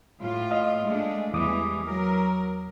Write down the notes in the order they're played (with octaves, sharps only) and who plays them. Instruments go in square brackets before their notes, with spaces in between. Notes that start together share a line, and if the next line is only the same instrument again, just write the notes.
[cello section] A2 F4
[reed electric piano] D#5 F5
[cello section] G#3 A3 D4
[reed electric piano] E2 D6 D#6 [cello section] E3 G3 G#3
[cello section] F#3 A#4